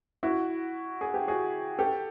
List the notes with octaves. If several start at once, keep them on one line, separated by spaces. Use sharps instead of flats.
E4 F#4
G#4
G4
F#4 G#4
G4 A4